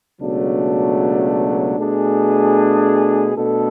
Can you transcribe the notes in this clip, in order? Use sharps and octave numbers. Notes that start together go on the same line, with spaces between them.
C#2 B2 F#3 A3 D4
B2 A3 D4 G#4
B2 A3 D4 A4